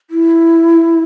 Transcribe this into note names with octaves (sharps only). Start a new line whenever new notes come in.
E4